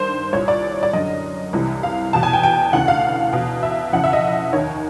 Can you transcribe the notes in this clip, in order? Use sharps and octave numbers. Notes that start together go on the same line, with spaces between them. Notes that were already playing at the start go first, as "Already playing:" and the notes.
Already playing: G2 D#3 C5
C2 A#2 C#5
D5
D5
F#2 D3 D#5
C2 C3 E3
F5
E2 B2 A5
G#5
G5
G5
D2 C#3 E3 F#5
F5
E2 B2
E5
F2 C#3 E3 F#5
E5
D#5
D#2 D#3 C#5